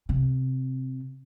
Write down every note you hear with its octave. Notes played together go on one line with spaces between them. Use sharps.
C3